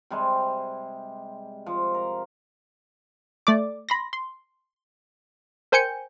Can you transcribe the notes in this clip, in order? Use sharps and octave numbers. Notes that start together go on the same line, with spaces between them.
C3 G3 G#3
F3
A#4
A3 D5 D6
B5 C6 A#6
C6
A#4 C5 G5 G#5 G6 C#7